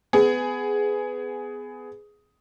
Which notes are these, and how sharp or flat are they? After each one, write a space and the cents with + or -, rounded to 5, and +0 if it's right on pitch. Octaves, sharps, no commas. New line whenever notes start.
B3 +25 G#4 +5